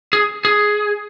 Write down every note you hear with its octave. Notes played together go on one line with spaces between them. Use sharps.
G#4
G#4